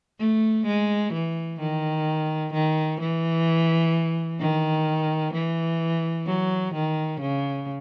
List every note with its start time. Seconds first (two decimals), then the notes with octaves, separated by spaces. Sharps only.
0.19 A3
0.66 G#3
1.13 E3
1.60 D#3
2.53 D#3
3.00 E3
4.40 D#3
5.34 E3
6.27 F#3
6.74 D#3
7.20 C#3